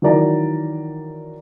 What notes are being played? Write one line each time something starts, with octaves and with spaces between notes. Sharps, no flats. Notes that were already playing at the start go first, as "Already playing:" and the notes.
D#3 E3 F#3 A#4 D5 A#5